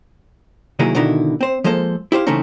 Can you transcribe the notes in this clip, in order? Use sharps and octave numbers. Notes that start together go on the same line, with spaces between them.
C3 D#3 F#3 A#3 E4 G#4
B2 D3 D#3 D#4 E4
C4 C5
F3 G#3 A#3 A4 C5
E4 G4 C5 F5
C#3 E3 A3 C4 C#4 D#4